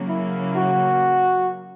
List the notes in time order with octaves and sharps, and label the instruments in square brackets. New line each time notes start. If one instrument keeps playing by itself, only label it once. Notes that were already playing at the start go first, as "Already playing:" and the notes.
Already playing: [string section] C#3 F#3 A#3
[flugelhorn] E4
F#4